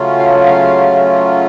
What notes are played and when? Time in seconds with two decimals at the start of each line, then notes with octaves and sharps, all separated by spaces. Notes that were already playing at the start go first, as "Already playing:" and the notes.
Already playing: C#3 F#3 A3 C#4 F4
0.19 F5
0.46 F5